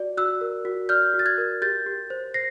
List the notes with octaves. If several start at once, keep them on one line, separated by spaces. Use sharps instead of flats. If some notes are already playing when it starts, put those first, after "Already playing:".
Already playing: F#4 D5
F#4 E6 F#6
A#4
F#4
D5 F6 G6
F#4
A6
F#6 G#6
A#4
G4 G6 A6
G4
C5
C5 A#6 C7